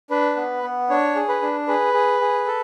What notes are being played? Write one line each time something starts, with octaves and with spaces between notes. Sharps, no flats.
D4 B4
B3
B3
D4 C#5
G#4
B4
D4
G#4 B4
G#4
G#4
A4